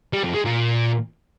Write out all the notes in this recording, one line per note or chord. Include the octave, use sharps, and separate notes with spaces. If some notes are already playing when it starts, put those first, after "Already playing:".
G3
F2
G#3
A#2